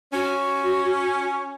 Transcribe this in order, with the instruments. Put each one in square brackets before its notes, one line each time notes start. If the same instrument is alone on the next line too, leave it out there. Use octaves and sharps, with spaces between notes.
[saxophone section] C#4 [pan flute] F#4